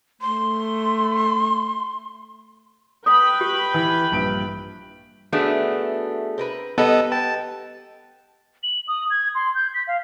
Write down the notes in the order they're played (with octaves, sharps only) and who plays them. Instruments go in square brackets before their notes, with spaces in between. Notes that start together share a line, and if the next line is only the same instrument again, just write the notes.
[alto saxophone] A3 [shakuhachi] C6
[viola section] B4 G5 B5 [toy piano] D#6
[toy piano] G4
[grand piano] E3
A#1 G2 D7
[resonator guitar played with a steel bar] A3 B3 D4 [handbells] F#4 G#4 E5 [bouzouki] B4
[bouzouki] C4 A#4 B4
[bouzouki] G3 D#5 F#5 [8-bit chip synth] B3 A4 [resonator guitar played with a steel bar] B4
[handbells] G5 [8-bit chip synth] A5
[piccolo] F#7
D#6
G#6
C6
G6
B6
F5